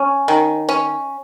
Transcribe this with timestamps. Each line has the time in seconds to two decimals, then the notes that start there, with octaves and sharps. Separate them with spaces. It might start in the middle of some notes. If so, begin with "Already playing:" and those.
Already playing: C#4
0.28 D#3
0.69 C#4